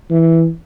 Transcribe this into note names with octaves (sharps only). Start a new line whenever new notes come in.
E3